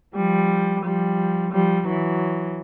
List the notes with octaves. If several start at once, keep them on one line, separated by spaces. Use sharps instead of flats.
F3 G3
F3 G3
F3 G3
E3 F#3